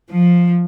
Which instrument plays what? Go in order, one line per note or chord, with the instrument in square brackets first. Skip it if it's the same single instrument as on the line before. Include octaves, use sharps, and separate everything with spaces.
[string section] F3